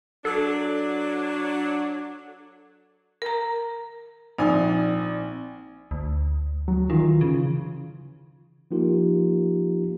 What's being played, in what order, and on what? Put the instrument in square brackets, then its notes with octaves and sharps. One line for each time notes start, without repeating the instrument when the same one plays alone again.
[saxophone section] F#3 D4 [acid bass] A4
[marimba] A#4 A#5
[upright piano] A#1 G#5 [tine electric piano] C4 D5 [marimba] D#4
[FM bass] D2
[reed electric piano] F#3
[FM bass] D#3 [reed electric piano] E3 F4
[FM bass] C#3
[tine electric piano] F3 A#3 D#4 F4 G4 A#4